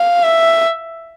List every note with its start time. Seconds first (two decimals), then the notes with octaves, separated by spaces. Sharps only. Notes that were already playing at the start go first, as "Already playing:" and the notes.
Already playing: F5
0.23 E5